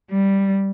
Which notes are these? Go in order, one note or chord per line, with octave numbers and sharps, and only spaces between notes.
G3